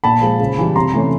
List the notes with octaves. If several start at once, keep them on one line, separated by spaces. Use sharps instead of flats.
A#2 A5 B5
F3 G#3
C#3
E3 G3
C3 A#5 C6
E3 A3 C#4